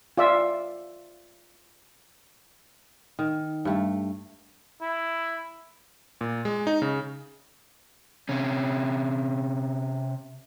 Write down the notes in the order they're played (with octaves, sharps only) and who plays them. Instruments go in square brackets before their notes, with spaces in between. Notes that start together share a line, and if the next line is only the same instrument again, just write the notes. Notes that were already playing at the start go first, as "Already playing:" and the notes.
[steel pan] F4 D5 E5
[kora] D#3
G2 A3
[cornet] E4
[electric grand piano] A#2
G#3
D#4
C#3
[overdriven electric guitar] C3 C#4